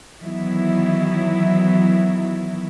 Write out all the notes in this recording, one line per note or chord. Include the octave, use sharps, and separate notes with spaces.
D#3 E3 F#3 B3 E4